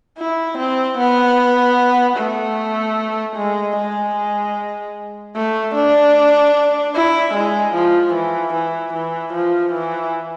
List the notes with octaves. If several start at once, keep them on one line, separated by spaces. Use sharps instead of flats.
E4
C4
B3
A3
G#3
G#3
A3
D4
E4
G#3
F3
E3
E3
E3
F3
E3